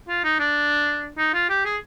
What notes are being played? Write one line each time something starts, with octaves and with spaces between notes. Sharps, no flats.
F4
D#4
D4
D#4
F4
G4
G#4